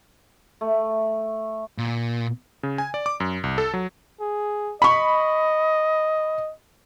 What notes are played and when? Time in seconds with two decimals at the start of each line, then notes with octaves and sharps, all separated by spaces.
0.61 A3
1.78 A#2
2.63 C#3
2.78 G#5
2.94 D5
3.06 D6
3.20 F#2
3.44 C2
3.58 A4
3.73 F#3
4.20 G#4
4.82 D#5 B5 C#6